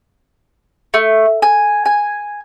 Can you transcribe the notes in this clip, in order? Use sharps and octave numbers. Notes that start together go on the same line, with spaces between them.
A3
G#5
G#5